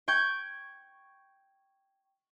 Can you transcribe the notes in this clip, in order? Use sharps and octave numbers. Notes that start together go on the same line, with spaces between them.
G5 C#6 G6 G#6